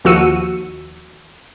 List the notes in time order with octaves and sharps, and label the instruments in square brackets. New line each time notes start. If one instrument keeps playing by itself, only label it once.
[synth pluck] D#2 F3 F#4 E6 C#7 D#7